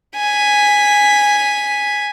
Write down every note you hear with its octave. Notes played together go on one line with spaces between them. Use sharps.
G#5 B6